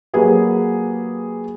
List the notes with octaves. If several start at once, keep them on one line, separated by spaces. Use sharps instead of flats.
F#3 A#3 G4 G#4 B4